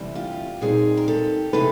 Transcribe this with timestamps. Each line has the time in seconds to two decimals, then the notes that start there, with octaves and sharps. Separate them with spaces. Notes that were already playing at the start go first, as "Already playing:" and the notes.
Already playing: D2 C3 E3 G3
0.15 F4 G4
0.61 A#2 G3 C4 D#4 F#4 G#4
0.97 A#4
1.08 G4 A4
1.53 C3 E3 G#3 B3 A4 B4